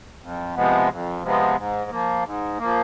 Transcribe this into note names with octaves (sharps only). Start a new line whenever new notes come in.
F2
C3 F3 G#3 B3
F2
C3 F3 G#3 B3
G#2
F3 A#3
G#2
F3 A#3